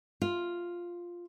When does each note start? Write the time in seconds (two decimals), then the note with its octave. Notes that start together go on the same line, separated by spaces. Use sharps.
0.22 F4